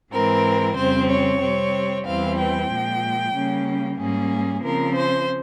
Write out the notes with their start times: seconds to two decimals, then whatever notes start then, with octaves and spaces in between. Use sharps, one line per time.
0.12 G#2 E3 G#3 C4 A#4
0.77 F2 C#3 G3 C4 C5
1.10 C#5
1.41 C3 G3 C4
2.05 E2 E3 G3 C4 F5
2.38 G5
2.69 A#2 F3 G#3
3.34 C#3 G3 A#3 C#4
3.98 G#2 G3 A#3 C#4 G#4
4.63 C#3 F3 C4 A#4
4.95 C5